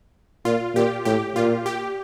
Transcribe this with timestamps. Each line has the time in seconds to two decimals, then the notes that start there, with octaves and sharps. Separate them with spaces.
0.45 A#2 F4
0.75 A#2 G4
1.05 A2 G4
1.36 A#2 F4
1.66 G4